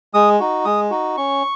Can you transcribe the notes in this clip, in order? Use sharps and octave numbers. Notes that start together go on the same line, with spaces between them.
G#3 D#6
D#4 F#4
G#3 D#6
D#4 F#4
C#4 C#6